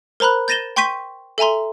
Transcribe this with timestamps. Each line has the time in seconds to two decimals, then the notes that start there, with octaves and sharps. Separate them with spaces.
0.20 A#4 C5 A#5 B5 F#6
0.48 G6 A6 A#6 D#7 E7 G7
0.76 G5 C6 C#6 G6 B6 D#7
1.38 A4 E5 G#5 A#5 C6